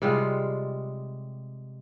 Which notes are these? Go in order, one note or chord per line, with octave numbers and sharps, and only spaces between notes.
C3 G3 G#3 F4